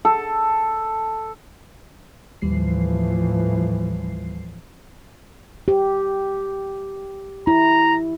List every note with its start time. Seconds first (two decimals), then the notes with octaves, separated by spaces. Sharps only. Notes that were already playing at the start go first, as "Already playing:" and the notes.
0.05 A4
2.42 D#2 A2 E3 F3 G3 C7
5.68 G4
7.47 E4 A#5